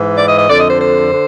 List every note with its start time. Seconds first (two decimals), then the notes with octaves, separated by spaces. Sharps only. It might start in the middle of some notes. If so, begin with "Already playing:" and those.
Already playing: G#2 E3
0.16 D5
0.27 D#5
0.37 D#5
0.49 F2 D3 D5
0.58 D#5
0.69 C5
0.80 C5
1.12 D3